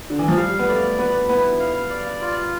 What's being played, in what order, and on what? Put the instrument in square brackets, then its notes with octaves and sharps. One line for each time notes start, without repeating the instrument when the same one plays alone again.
[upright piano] D3
E3
F3
[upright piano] G3 [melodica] F5
[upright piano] B3
[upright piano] A3 [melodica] D5
[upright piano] B3 [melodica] B4
[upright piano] B3 [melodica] E4
[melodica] F5
D5
F4